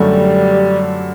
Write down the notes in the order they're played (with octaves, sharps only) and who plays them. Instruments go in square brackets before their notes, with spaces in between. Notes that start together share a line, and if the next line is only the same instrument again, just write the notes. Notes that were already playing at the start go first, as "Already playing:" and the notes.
Already playing: [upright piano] F#2 D3 F#3 A3 [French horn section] G3